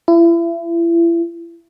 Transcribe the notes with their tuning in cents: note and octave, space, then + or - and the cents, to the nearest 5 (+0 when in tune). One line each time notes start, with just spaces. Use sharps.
E4 +35